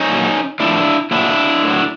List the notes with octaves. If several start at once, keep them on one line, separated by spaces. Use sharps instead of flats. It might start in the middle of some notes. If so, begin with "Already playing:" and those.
Already playing: C#4 D#4
A#2 F#3
A2 F3 D4 E4
A#2 F#3 D4 E4
A2 F#3